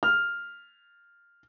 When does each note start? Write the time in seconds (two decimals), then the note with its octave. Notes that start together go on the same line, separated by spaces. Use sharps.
0.03 F6